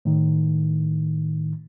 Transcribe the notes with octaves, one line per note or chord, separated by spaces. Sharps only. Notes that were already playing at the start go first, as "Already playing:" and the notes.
A2 D#3